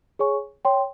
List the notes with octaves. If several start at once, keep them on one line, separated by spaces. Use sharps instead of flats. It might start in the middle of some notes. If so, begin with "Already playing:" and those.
G#4 C#5 G#5 C#6
C#5 G5 C6